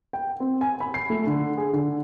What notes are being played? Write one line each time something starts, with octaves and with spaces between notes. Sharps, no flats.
G5
C4
G#5
B5
C7
A3
D3
G#4
D3